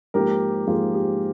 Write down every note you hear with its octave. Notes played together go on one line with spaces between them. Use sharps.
G#2 F3 A#3 G4 A#4
G#2 F3 A#3 F4 G#4
G4